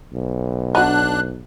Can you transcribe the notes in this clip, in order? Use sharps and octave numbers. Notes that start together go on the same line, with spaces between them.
B1
D4 D#4 F#4 F#6